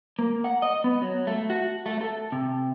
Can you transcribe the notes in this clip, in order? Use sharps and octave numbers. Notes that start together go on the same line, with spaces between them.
A#3
F#5
D#5
B3
F#3
A3
F#4
A3
A4
C3